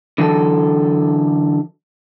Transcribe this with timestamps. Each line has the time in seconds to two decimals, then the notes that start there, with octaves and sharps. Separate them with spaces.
0.18 D3 E3 F#3 A4